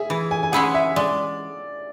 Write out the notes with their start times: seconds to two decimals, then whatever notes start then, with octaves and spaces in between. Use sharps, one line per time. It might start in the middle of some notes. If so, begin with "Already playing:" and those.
Already playing: G#4 E5
0.10 E3
0.31 G#5
0.43 G#5
0.52 G#3 C#4 E4 G#4 F#5
0.75 E5
0.96 G#3 D5